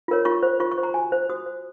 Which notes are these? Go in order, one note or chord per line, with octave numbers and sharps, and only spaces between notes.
F4 A#4 C#5
F4 C#6
C5
F4 C#6
C#6
C5
A#5
F#4 G#5
C5
F#4 D#6
C5